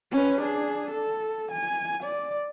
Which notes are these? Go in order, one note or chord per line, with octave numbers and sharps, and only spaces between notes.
C#4 B4
D4 G#4
A4
G#5
D5